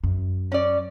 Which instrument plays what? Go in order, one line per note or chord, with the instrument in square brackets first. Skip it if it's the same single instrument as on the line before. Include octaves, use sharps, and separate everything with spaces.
[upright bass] F#2
[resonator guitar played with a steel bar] C#4 D5